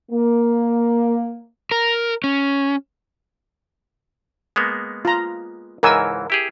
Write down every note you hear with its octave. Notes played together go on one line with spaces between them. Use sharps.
A#3
A#4
C#4
G#3 A#3 B3
F4 A#5
C#2 G#2 E3 A#4 G#5 E6
E4 G4 G#4